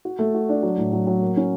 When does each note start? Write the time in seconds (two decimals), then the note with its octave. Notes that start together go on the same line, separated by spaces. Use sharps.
0.05 F#4
0.19 A3
0.34 F#4
0.49 D4
0.63 F#3
0.77 A2
0.93 F#3
1.07 F#3
1.22 A#3
1.37 C#4